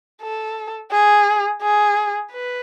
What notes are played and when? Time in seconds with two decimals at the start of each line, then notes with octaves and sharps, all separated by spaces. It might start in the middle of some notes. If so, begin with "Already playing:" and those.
0.22 A4
0.92 G#4
1.62 G#4
2.32 B4